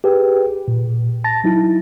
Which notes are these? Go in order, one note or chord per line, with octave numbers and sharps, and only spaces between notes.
G4 G#4 B4 G5
A#2
A5 A6 A#6
F#3 D#4 E4